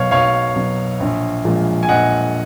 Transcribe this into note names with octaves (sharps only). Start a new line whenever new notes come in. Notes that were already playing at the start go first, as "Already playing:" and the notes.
Already playing: B1 B2 F#3 C#5 F5
B1 C#5 F5
B2 F#3
A#1
A#2 F3 G#3
G#5
A#1 D#5 F#5